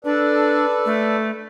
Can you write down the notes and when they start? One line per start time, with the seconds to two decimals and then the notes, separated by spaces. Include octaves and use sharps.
0.05 D4 A4 B4 D5
0.86 A3